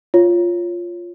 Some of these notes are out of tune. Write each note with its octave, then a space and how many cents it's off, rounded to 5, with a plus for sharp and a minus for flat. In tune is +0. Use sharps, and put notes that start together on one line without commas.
F4 +0 C#5 +0